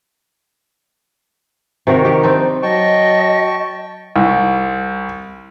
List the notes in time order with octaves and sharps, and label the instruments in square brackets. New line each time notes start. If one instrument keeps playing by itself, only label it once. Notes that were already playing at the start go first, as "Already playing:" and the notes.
[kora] C3 D#3 F#4 A#4
D#3 G4
C4 D4 D#4
[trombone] F#3 [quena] D#5 [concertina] G5 A5 C#6
[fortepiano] C2